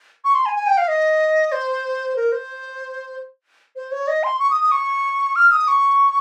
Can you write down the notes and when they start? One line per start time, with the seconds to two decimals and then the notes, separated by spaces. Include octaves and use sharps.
0.24 C#6
0.35 C6
0.46 G#5
0.56 G#5
0.67 G5
0.77 F5
0.88 D#5
1.52 C5
2.16 A#4
2.32 C5
3.76 C5
3.91 C#5
4.08 D#5
4.23 C6
4.39 C#6
4.51 D#6
4.61 D#6
4.71 C#6
5.36 F6
5.52 D#6
5.68 C#6